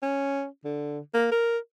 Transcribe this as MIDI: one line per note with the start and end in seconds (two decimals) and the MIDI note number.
0.03 0.46 61
0.65 0.99 50
1.14 1.29 58
1.32 1.58 70